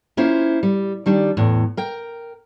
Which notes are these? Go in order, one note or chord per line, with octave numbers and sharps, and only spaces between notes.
A#3 C#4 E4 F4 C5
G3
D#3 G3 D4
E2 A2
A#4 G5